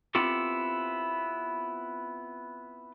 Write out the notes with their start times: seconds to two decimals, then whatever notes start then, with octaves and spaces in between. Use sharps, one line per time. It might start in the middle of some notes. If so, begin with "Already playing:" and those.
0.15 B3 C4 E4 F4 G4 A4